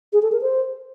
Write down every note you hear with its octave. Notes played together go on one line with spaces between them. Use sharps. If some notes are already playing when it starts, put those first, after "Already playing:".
G#4
A4
A#4
C5